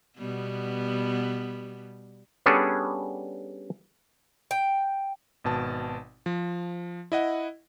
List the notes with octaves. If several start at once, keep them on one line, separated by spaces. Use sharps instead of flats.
B2 G3 B3
G3 B3 C#4 D4 G#4 A4
G5
G#1 B2 A5
F3
E4 D#5 F#5